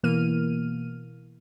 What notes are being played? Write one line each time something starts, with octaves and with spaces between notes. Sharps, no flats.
B2 E3 A#3 F6 D#7